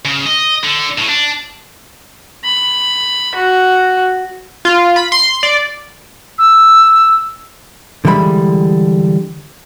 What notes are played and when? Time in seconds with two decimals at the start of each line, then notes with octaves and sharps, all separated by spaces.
0.05 C#3
0.26 D#5
0.63 D3
0.98 A2
1.09 D4
2.44 B5
3.35 F#4
4.65 F4
4.96 B5
5.12 C6
5.43 D5
6.39 E6
8.05 D3 E3 G3 G#3 G5 B5